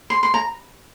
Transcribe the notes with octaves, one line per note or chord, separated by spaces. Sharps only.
C6
C6
A#5